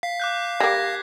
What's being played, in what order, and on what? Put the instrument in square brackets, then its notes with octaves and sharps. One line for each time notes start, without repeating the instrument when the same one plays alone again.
[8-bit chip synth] F5 [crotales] B6
[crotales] D6 F#6 G6
[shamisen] G3 A#3 [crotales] G#6 A#6 C7